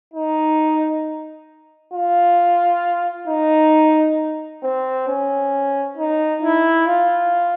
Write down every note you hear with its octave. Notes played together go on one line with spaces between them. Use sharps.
D#4
F4
D#4
C4
C#4
D#4
E4
F4